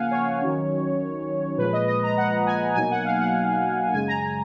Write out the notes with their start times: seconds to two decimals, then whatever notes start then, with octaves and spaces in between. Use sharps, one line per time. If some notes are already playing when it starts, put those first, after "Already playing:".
Already playing: C#3 F3 A#3 F5 F#5 G#5
0.11 C#5
0.41 D#3 F#3 C#4
1.57 A#2 F3 G#3 B4
1.73 D#5
1.88 D#5
2.02 A#5
2.17 F#5
2.46 G#5
2.75 B2 F#3 A#3 D#4 G#5
2.91 F#5
3.05 F5
3.20 F#5
3.92 F#2 C#3 G#3 G#5
4.08 A#5
4.22 G#5